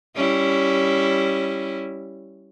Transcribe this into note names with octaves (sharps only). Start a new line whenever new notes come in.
G3 C#4 E4